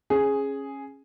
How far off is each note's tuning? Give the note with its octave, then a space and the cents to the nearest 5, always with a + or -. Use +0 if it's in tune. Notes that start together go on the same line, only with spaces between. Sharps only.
C#4 -15 G#4 +0